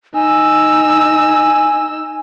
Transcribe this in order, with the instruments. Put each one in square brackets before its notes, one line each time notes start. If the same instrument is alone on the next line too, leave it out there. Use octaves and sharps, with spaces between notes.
[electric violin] D#4 E6 [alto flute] G#5